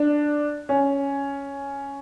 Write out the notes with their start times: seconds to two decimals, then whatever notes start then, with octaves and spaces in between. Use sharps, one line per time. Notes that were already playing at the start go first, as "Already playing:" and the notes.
Already playing: D4
0.69 C#4